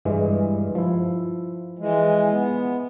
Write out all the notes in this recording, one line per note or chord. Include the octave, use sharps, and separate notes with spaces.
G2 E3 G#3
F3 E4
E3 G#3
B3